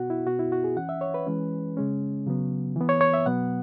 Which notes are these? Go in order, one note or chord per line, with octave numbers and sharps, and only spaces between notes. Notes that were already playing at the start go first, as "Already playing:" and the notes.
Already playing: B2 B3 F#4 F#5
E4
B2 B3 F#4
E4
F#4
G#4
E3 C#4 F#5
E5
C#5
B4
E3 G#3 C#4
C#3 G#3 C#4
C#3 F#3 B3
E3 B3
C#5
C#5
E5
B2 F#3 B3 F#5